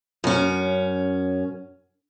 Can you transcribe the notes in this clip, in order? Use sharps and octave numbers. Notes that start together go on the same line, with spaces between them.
F#2 C#4